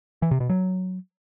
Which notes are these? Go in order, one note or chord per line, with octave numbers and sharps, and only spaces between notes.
E3
C3
B2
F#3